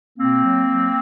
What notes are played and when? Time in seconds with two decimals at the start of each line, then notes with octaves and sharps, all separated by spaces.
0.18 B2 A#3 C4
0.45 F#3
0.69 F#3